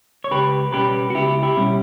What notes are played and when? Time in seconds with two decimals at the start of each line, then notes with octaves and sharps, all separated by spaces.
0.24 C#5
0.31 C#2 G4 B4
0.73 B2 G3 C#4 G4 B4
1.10 F#4
1.14 C#2 E4 G4
1.43 E4 G4
1.57 B2 G3 C#4